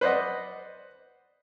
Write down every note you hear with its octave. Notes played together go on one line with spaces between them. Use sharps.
B4 C5 D5 D#5 F#5